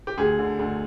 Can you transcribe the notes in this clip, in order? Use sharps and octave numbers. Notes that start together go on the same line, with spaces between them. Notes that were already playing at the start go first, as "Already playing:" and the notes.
G4
D2 G#4
D3
D2